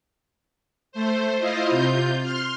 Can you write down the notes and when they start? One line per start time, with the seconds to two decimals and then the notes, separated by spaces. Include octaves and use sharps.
0.92 A3 C5
1.37 E4 F4 C5 D#5 F5
1.70 C3 F4 G6
2.21 C6 F6